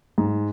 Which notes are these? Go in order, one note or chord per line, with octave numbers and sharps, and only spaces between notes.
G#2